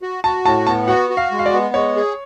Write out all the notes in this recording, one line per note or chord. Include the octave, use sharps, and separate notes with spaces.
F#4
F#4 A5
A2 A5
B3 A5
F#4 F#5
F#4
F5
G#3
F5
D5
B3
G#3 C#5
G#4